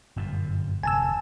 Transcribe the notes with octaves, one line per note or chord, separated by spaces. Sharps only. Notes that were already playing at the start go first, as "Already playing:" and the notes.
G1 F#2 A#2
F1 E2 G#5 A5 E6